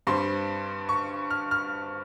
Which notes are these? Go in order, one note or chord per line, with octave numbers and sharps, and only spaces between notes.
G2 G3 C4 C6
C#6
F6
F6